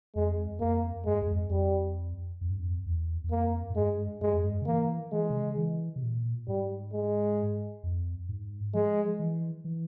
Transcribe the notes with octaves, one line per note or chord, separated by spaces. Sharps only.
F2 G#3
F2 A#3
G2 G#3
E2
F2
F2 G3
F2
G2
F2
E2
E2
F2 A#3
G#2
G2 G#3
G2 G#3
F2
G2
C#3
E3 A#3
E3 G#3
C3
C#3
E3
C3
A#2
G#2 G3
G#3
F2
G#2
F3 G#3
E3
E3